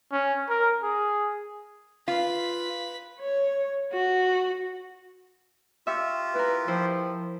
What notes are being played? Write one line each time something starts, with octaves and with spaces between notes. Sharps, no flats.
C#4
A#4
G#4
F4 B4 B6
C#5
F#4
F4 G4 E5 C#6
E4 A#4 B4
F3 E4 C5 G5